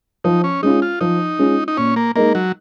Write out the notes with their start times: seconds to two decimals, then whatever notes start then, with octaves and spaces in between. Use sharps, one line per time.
0.24 F3 D#4
0.44 C#4
0.62 G#3 C#4 D#4 F4
0.82 F4
1.01 F3 D#4
1.39 G#3 C#4 F4
1.68 D#4
1.77 A#2 C#4
1.96 A#3
2.16 G#3 A#3 D#4 A#4 D#5
2.35 F#3